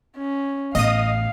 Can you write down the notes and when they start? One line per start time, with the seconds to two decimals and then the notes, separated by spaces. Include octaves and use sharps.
0.17 C#4
0.75 A1 B3 D#5 F5 D#6